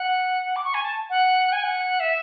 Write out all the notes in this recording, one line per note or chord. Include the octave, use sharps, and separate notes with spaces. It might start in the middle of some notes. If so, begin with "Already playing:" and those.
Already playing: F#5
D6
C#6
G#5
A5
F#5
G#5
F#5
E5